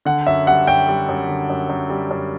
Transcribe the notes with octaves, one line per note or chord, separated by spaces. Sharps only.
D3 F#5
F#2 E5
G3 F#5
F#2 G5
G3
F#2
D3
F#2
F#2
G3
F#2